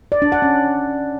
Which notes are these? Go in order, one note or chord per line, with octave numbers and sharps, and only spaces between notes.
D5
D4
F#5
C#4